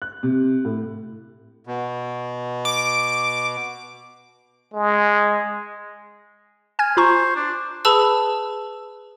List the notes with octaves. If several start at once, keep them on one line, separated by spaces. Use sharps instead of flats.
F#6
C3
A2
B2
D6
G#3
G#5 F6 G#6
F4 C5 A#5 C#6
D4
G#4 B4 A5 B5 E6